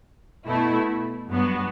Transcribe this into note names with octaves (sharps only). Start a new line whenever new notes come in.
B2 A3 E4
G2 F#3 B3